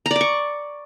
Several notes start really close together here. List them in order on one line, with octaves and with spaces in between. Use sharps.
A#5 D5 D6 C#6